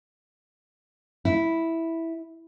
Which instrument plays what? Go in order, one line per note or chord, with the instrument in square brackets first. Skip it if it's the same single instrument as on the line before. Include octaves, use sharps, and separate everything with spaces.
[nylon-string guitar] E4